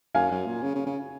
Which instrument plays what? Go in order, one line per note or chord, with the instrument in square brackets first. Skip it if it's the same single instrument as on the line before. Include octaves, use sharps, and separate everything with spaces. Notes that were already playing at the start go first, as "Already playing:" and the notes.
[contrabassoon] F#2 [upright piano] F5 G#5
[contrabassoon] F#2
A#2
C#3
C#3
C#3